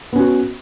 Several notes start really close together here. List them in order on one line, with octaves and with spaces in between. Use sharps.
B3 C#4 F#4